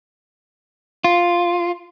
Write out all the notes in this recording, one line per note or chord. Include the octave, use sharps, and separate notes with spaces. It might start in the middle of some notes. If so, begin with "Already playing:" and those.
F4